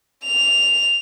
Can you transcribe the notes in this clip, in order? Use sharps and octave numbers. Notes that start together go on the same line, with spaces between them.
F7